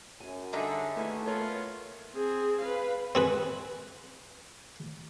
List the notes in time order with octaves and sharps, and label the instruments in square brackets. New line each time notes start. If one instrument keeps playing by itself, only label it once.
[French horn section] F#2 [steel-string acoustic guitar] G#5
[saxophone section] D3 [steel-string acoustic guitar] G3 [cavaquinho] D#4 G#4 E5
[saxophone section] D#2 [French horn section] A3 [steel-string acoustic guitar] B3 E4 G#5
[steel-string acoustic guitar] A#3 A#4 C#5 [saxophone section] B3 F4
[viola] C4 G#4
B4 F5
[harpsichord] C4 G#4 B4